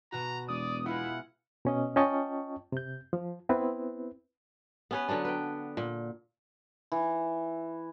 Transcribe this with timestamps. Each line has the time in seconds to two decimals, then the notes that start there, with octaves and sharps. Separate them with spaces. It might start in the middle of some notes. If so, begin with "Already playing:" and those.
0.12 B2 F#4 A#5
0.48 E1 D5 D#6
0.86 G#3 B3 E4 F4 F#5
1.65 B2 C#4 D#5
1.96 C#4 F4 D#5 G5 A5 C#6
2.72 C3 G6
3.13 F3
3.49 B3 C4 E4 B4
4.91 B3 C#4 B4
5.08 D3 F#3 B3 D4
5.25 B4 G5
5.77 A#2
6.92 E3